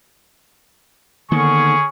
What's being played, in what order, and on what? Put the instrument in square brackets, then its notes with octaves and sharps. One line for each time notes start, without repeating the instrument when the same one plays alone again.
[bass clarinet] D3 [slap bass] D#3 A#3 B3 [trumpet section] C#4 G#4 C#6